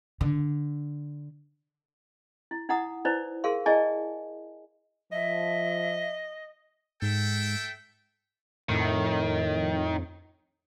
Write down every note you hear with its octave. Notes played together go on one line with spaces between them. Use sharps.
D3
E4
D#4 E4 F#5 A#5 D#6
D#4 E4 B4 C5 D5
G#4 A#4 F5 C6
E4 G#4 D5 D#5 G#5 A5
F3 D#5 E5
G#2 A4 E5 G5
F2 A2 D#3